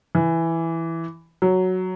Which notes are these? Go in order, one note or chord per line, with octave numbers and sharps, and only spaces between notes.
E3
F#3